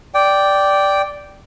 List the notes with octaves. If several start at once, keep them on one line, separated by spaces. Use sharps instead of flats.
D5 G5